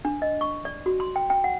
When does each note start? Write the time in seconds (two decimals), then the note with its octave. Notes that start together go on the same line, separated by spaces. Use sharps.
0.05 D4
0.22 D#5
0.41 C#6
0.65 D5
0.86 F#4
1.00 C6
1.16 G5
1.30 G5
1.44 F#5